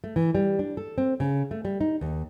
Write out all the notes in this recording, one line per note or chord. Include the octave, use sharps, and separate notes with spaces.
A3
E3
G3
D4
A4
C4
C#3
A3
G3
D#4
D#2